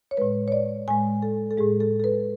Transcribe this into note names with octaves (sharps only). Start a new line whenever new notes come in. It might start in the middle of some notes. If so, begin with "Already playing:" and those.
C#5
A2 G#3 B4
C#5
D5
A2 G#3 G#5
A4
A4
A2 G#3 G#4
A4
A4
B4